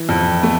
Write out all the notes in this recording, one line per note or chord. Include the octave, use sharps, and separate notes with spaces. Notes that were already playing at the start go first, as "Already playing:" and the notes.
Already playing: E3
F2
A3